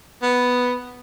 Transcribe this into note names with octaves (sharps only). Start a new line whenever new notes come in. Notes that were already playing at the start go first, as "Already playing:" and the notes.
B3